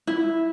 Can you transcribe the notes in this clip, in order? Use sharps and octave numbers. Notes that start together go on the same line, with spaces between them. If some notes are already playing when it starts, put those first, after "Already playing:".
E4